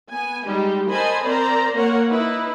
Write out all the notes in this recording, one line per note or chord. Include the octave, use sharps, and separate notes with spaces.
B3 G#5
G3 G#3 D#4 G4
A#4 C5 D#5 G#5 A5 B5
C4 A#4 C5 D5 A#5
A#3 A#4 C#5 F#5
D#4 E4 B4